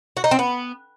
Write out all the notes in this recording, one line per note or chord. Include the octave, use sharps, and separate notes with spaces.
F#4
D#4
C4
B3